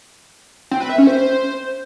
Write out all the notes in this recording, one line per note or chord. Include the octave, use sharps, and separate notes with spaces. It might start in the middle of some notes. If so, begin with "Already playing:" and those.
C4
B4
E5
C#4
C5